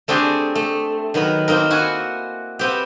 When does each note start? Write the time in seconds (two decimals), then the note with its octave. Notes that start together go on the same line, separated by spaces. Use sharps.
0.08 A3 C4 D4 G4 G#4
0.55 A3
1.14 D#3 F#3 B3 A#4 B5
1.48 A#3 C4 D#4 A#4
1.70 E4 F#4 F#5 G#5
2.59 B3 C4 G4